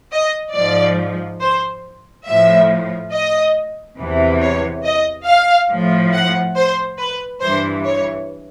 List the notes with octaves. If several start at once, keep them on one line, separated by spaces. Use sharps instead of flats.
D#5
G#2 F3 D5
C5
A2 F3 E5
D#5
E2 C3 E3
C#5
D#5
F5
A2 F3
F#5
C5
B4
G2 E3 C5
C#5